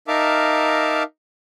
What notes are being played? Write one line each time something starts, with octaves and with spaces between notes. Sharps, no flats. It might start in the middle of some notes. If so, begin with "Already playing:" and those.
D#4 A#4 E5 F5 A5 D6